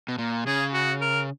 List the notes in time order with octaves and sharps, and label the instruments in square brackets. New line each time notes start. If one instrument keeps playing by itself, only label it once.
[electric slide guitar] B2
A#2
[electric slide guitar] C#3 [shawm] G#4
[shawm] F#4
A#4